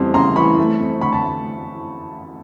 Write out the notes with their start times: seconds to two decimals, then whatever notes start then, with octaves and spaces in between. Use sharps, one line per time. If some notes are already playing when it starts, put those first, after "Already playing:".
Already playing: F2 C#3 E3 G3 C6
0.14 C#3 A#5 C6
0.36 E3 B5 C#6
0.58 A3
0.80 F2
1.01 D3 B5 C#6
1.13 A5 B5